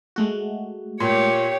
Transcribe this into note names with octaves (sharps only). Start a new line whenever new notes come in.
G#3 A3 F#4
A#2 G4 C#5